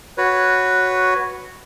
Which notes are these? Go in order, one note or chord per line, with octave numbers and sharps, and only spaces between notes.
F#4 B4 C#5